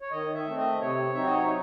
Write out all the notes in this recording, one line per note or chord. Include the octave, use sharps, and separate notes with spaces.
C#5
D#3 D#5
E5
A3 C4
D#5
C3 C#5
F#3 C4 D#4 E5
D#5
C#5